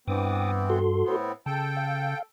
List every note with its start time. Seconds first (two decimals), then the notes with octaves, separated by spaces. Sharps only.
0.08 G2 E3 B3 C4 G5 D6 D#6
0.70 F#4 A4 C6
1.05 A2 B3 C4
1.46 C#3 A4 G5 A5
1.77 F5